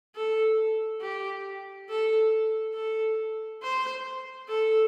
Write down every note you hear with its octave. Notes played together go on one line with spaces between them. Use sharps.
A4
G4
A4
A4
C5
A4